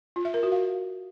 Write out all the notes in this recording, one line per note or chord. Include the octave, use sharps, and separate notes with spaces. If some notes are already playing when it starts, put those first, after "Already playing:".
F4
E5
A#4
F#4
F5